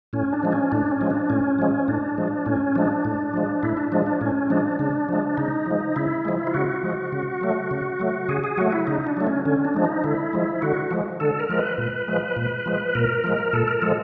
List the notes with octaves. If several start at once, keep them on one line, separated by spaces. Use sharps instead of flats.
A2 C#4
D4
F3 G#3
C#4
A2 D4
C#4
F3 G#3
D4
A2 C#4
F3 G#3
A2 D4
F3 G#3
A2 C#4
F3 G#3 D4
A2
F3 G#3
A2 E4
D4
F3 G#3 D4
D4
A2 C#4
F3 G#3 D4
C#3 D4
F3 G#3
C#3 D#4
F3 G#3
C#3 E4
F3 G#3
F4
C#3 F#4
F3 G#3
C#3
F#3 A3
C#3
F#3 A3
C#3 G#4
G#4
F#3 A3 F#4
E4
C#3 D#4
D4
F#3 A3
C#4
D3 C#4
D4
F3 G#3
D#4
D3 E4
F3 G#3
D3 F#4
F3 G#3
D3 A4
A#4
F3 G#3
B4
A#2
F3 G#3
A#2
F3 G#3
A#2 A#4
F3 G#3
A#2 A4
A#4
F3 G#3 A4